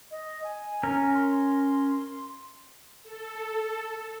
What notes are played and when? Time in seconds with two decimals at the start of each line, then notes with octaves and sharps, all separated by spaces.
0.11 D#5
0.44 G#5
0.83 C#4 A#4
1.15 C6
3.03 A4